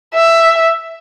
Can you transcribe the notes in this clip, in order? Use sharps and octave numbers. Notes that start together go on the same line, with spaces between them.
E5